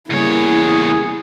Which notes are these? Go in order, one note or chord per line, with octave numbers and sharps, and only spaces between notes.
E2 C#3 G3 A#3 E4 G#4 C#5